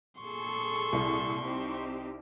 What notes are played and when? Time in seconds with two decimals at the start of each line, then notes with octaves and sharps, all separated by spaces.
0.21 A#2 G#4 A4 C6 C#6
0.93 C2
1.42 C4 D#4 G4